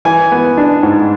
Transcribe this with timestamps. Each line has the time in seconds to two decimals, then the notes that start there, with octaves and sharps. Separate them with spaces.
0.05 E3 G#5
0.32 B3
0.58 D4
0.83 G#2